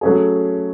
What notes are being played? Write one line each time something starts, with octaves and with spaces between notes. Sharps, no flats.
F#3 A3 C#4 G#4